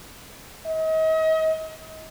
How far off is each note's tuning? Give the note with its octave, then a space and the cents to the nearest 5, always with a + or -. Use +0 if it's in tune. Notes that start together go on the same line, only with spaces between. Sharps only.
D#5 +35